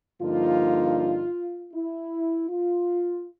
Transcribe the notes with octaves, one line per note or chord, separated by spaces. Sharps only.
G2 D3 F3 A#3 D#4 F4
E4
F4